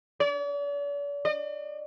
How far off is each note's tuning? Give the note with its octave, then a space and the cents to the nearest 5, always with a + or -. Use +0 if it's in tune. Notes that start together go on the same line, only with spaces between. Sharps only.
D5 -45
D5 +45